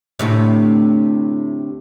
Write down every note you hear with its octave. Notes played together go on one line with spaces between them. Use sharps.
D2 A2 C3